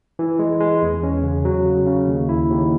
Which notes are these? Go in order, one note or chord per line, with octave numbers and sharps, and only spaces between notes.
E3
G#3
G#3
E2
C#4
C#3
F#3
C#3
C#3
D#2
E4
D#2